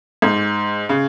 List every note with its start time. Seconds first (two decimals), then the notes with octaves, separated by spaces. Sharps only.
0.22 G#2
0.89 C#3